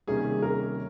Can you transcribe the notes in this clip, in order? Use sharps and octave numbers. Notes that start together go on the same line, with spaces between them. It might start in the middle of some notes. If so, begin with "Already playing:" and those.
C3 D#3 G3 A#3 C#4 G#4
A#4